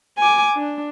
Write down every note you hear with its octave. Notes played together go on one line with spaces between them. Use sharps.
G#5 D6
D4